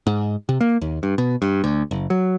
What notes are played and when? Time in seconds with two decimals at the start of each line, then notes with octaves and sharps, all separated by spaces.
0.07 G#2
0.49 C3
0.61 A#3
0.81 D#2
1.03 G2
1.18 B2
1.42 G2
1.64 D2
1.91 F#1
2.10 F#3